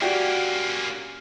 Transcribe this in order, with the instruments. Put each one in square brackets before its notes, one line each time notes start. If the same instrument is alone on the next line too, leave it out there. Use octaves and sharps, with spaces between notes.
[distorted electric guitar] A#3 C#4 [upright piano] F#4 G4 D5